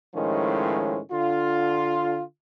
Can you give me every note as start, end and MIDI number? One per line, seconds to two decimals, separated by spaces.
0.14 1.00 45
0.14 1.00 51
0.14 1.00 53
0.14 1.00 56
0.14 1.00 61
1.11 2.21 50
1.11 2.21 65